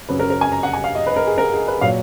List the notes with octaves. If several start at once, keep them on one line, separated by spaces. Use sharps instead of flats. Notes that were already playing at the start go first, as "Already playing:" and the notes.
F#2 C#3 F#3 B4
A#4
A#4
G#5
A#5
F#5
G#5
F5
D#5
B4
A#4
G#4
A#4
G#4
B4
A#2 F#3 F5